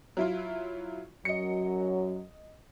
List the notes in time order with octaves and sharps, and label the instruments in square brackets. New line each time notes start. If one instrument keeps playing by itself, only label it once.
[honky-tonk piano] F#3 E4 F4
[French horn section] F#2 F#3 [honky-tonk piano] D#5 C#7